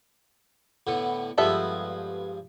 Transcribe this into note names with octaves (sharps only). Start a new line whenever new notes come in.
A2 D3 B3
G2 F3 G#3 B3 A4 E5